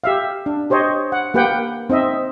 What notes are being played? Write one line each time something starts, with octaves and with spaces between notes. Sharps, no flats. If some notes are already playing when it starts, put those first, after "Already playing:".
G4 E5 F5
D4
G4 C5 C#5 D#5
F#5
A#3 G4 B4 F#5 G5
C4 D#4 D#5 E5